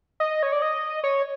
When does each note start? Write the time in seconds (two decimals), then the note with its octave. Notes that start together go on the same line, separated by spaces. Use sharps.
0.20 D#5
0.43 C#5
0.52 D5
0.62 D#5
1.04 C#5